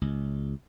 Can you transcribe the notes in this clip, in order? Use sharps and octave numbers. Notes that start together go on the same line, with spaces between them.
C#2